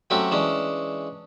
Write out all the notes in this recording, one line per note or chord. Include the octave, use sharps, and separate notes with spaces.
F#3 A3 C4 C#4 F#4 G4
E3 G#3 C#4 D4